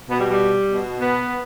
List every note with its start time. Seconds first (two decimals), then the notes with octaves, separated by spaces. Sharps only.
0.10 B2 B3
0.20 G3
0.31 G3
0.70 B2
1.00 B3